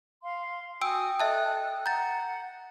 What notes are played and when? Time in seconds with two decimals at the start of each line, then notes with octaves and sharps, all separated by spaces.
0.23 F5 C6
0.82 F#4 G5 G#5 D#6 E6 D7
1.20 A4 D#5 E5 A5 D#6 F#6
1.86 F#5 A#5 G6 A6